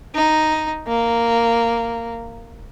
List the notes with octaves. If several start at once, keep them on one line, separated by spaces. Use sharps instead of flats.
D#4
A#3